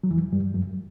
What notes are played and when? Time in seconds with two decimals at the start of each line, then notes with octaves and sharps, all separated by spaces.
0.04 F#3
0.10 E2 E3
0.33 G2 G3
0.54 F#2 F#3